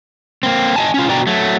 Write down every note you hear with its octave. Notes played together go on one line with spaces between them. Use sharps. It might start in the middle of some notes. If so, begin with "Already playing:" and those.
A#3 C4
D#5 E5 G#5 A5
C#4 F4
B2 D4 F#4 D5 G5 A#5
F#3 A3